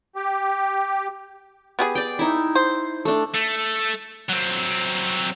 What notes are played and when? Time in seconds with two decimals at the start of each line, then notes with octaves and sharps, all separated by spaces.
0.15 G4
1.79 B3 G4 G#4
1.95 D5 G5
2.19 D#4 E4
2.55 C5
3.05 A3 D4
3.35 A3
4.29 F#3 C4